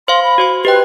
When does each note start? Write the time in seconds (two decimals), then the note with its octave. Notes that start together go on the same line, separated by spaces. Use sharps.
0.08 C5 F5 C6
0.23 B5
0.38 F#4 C5 C6
0.65 G4 B4 D#5 G5